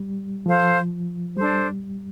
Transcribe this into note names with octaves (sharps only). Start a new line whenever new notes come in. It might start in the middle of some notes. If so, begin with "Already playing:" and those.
Already playing: G3
F3 A4 C5 F5
G3 D4 A4 C5